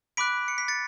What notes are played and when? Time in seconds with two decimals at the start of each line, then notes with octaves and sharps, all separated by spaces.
0.17 B5 D6 F#6 B6 D7
0.48 C#7
0.58 B6
0.68 A6 C#7